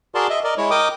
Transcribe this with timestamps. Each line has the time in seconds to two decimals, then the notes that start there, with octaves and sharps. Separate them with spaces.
0.15 F#4 G#4 A#4 D5 A5 C6
0.30 D#5 E5
0.44 A#4 D5 D#5
0.58 G#3 E4 C#5
0.71 A#4 D#5 G5 D6 D#6